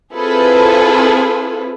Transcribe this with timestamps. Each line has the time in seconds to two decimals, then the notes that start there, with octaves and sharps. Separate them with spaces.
0.13 C4 E4 F4 G#4 A4 B4